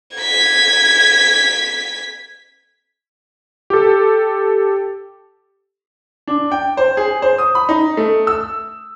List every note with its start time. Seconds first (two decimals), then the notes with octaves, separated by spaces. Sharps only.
0.16 G#6 B6
3.70 G4 A4
6.27 D4
6.51 G5
6.77 C5
6.97 G#4
7.22 C5
7.38 D#6
7.55 B5
7.69 D#4
7.97 A3
8.27 E6